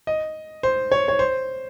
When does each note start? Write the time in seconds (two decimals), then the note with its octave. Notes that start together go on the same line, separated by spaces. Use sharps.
0.07 D#5
0.63 C5
0.92 C#5
1.08 C#5
1.19 C5